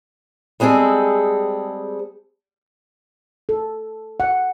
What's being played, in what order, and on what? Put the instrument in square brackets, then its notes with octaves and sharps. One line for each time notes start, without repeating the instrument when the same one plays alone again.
[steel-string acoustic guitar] G3 G#3 C4 G#4 A4
[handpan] A4
F#5